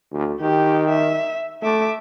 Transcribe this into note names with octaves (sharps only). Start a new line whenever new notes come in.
D2
D#3 G4
E5
A3 E5 D6